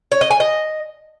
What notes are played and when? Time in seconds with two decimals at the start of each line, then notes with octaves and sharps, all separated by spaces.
0.12 C#5
0.21 D#5
0.31 G#5
0.40 D#5